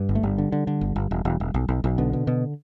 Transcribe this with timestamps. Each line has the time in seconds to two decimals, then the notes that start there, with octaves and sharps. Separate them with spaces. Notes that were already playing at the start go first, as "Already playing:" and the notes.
Already playing: G2
0.09 G1
0.15 A3
0.23 G1 G3
0.38 D3
0.52 D3
0.67 D3
0.81 G1
0.96 G1
1.11 E1
1.25 E1
1.40 E1
1.54 B1
1.68 B1
1.84 B1
1.98 B2 D3
2.13 B2
2.27 B2